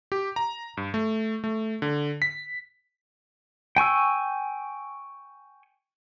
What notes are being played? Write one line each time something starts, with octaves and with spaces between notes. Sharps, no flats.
G4
A#5
G2
A3
A3
D3
B6
G5 G#5 C#6 E6